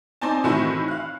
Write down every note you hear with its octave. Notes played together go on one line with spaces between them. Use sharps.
C4 D#4 D5 G#5 A5
A2 D#3 E3 C4 E4 F#4
F5 F#6